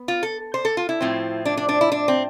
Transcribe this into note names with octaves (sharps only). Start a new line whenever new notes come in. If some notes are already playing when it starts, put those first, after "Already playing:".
Already playing: B3
F4
A4
C5
A4
F4
E4
A2 F3 C4
D4
D4
D4
E4
D4
C4